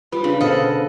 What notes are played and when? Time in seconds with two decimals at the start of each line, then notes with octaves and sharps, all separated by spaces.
0.12 G3 F4 B4
0.24 C#3 D4
0.41 B2 D3 A4 C5 D#5 F5 F#5